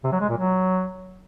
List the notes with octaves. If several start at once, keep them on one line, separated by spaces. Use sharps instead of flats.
C3
F#3
G#3
A#2
F#3